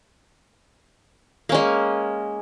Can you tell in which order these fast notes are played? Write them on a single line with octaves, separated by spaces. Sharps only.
A#3 C#4 G#3